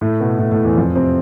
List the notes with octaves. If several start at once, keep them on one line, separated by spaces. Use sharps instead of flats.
A2 A3
B2 B3
A2 A3
A2 A3
E2 E3
F2 F3
C3 C4